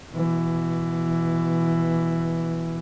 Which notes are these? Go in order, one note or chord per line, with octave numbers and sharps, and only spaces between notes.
B2 E3